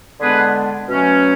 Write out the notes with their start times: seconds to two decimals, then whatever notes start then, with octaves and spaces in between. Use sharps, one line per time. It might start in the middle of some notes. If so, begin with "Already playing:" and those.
0.20 D3 G#3 B3 D4 G#4 B4
0.88 B2 F#3 A3 C#4